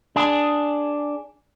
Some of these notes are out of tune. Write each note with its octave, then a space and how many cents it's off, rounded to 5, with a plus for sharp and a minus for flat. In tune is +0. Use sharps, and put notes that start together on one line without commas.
D4 +0 G#4 +0